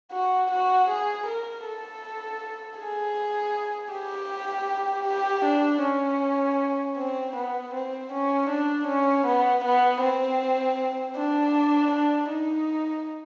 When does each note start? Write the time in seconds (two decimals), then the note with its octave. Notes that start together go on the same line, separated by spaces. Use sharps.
0.12 F#4
0.51 F#4
0.89 G#4
1.26 A#4
1.65 A4
2.78 G#4
3.92 G4
5.08 G4
5.45 D4
5.83 C#4
6.97 C4
7.36 B3
7.73 C4
8.12 C#4
8.49 D4
8.87 C#4
9.26 B3
9.64 B3
10.01 C4
11.16 D4
11.91 D4
12.30 D#4